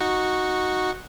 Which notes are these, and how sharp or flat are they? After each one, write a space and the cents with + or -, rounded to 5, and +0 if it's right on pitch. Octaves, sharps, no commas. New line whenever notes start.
D#4 +0 F#4 -5 C#6 -10